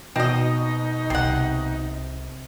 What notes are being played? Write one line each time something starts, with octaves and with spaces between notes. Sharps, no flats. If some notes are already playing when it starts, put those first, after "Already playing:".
B2 C4 D#4 F#4 D#5 A#6
C2 C3 C4 F#5